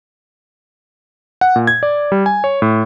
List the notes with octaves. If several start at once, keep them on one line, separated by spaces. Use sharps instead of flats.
F#5
A#2
G#6
D5
G3
G#5
C#5
A2